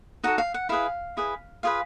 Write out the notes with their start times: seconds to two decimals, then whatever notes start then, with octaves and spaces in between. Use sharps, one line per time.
0.24 D#4 F#4 A4 F#5
0.38 F5
0.54 F#5
0.69 E4 G#4 B4 F5
1.17 E4 G#4 B4
1.63 F4 G#4 B4 F5